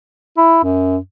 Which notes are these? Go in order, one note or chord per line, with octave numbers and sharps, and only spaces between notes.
E4
F#2